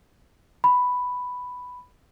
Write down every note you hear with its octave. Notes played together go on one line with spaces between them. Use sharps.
B5